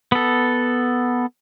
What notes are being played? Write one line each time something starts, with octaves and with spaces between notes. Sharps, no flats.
B3 A4